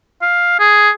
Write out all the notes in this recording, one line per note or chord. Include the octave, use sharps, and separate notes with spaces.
F5
G#4